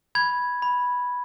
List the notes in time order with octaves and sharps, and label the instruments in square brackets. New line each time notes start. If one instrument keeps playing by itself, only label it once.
[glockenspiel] B5 G#6
B5